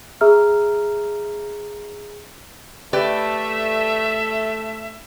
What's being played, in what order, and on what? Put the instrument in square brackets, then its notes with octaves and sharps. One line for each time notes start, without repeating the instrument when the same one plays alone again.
[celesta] G#4 E5 A#5 E6 F6
[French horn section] A3 [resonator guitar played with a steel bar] G4 B4 D5 [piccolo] E5